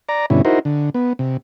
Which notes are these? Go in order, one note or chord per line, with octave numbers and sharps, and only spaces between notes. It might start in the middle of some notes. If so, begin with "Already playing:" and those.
D5 A#5
G2 B2 D3 C#4 E4
D#4 E4 F#4 A#4 C5
D3
B3
C3